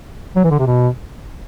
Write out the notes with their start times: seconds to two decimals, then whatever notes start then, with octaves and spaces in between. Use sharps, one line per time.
0.36 F#3
0.44 E3
0.51 D3
0.59 C3
0.67 B2